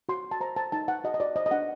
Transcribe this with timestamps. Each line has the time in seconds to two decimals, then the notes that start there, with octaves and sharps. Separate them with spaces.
0.09 F#4 C6
0.24 F#4
0.31 A5
0.40 C5 A#5
0.56 C5 A5
0.72 D#4 A5
0.88 D#4 F#5
1.04 F#4 D#5
1.14 D#5
1.20 F#4 D5
1.36 C5 D#5
1.46 D#5
1.51 D4 F#5